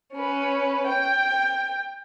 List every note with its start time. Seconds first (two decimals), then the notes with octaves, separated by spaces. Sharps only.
0.14 C#4 B4
0.87 G5